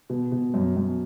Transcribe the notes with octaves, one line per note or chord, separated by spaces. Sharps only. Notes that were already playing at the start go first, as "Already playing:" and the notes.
B2
B2
F#2
F#2